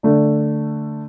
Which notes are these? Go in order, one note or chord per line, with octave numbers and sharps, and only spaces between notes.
D3 A3 D4